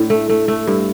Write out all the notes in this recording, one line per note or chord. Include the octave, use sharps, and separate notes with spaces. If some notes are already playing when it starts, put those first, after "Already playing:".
Already playing: A2 D4
A3
A3
A3
G2